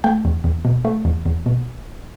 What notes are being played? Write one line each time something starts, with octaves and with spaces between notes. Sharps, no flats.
A3 G5
E2
E2
B2
A3
E2
E2
B2